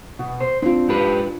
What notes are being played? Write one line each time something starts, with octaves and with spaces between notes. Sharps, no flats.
B2
C5
C4 D4 F4
G#2 G4 B4